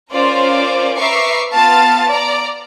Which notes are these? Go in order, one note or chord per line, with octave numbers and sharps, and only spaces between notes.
C#4 F4 A#4 C5 D5
B4 E5 A#5 C#6 D6 C7
B3 F4 F5 A5 A6
D5 A#5